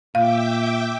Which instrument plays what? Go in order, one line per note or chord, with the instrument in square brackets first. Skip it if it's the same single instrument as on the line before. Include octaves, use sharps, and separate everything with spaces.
[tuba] A#2 [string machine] E5 G5 D6 [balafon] F5